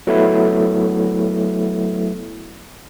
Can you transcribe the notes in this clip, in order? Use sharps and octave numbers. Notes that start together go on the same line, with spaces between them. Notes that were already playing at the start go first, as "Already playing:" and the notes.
F#3 A3 B3 E4